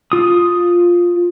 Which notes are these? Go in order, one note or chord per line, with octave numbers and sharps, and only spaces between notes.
F4 D#6